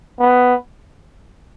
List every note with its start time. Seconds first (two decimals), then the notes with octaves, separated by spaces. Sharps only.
0.20 B3